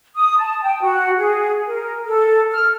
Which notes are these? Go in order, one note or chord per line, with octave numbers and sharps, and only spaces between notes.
D#6
A5
G5
F#4
G#4
A#4
A4
F6